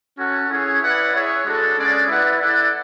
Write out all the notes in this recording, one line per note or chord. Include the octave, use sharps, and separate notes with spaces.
C#4 F#4 A4 C#5 F#5
C#4 E4 G#4 C#5
E4 B4 D5 F#5
E4 G#4 C#5 E5
G#3 D4 F#4 A4
G#3 C#4 G#4 D5 F#5
E4 B4 D5 F#5
E4 A4 D5 F#5